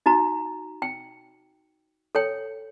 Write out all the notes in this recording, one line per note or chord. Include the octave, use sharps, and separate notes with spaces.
D#4 F#4 A#5
G5
A4 C#5 G5